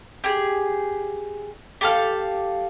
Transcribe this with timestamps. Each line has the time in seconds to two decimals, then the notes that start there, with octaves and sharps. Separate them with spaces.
0.24 G4 G#4
1.81 G4 A4 F5